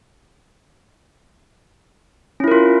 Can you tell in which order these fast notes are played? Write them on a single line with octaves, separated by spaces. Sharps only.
C#4 E4 A#4 F4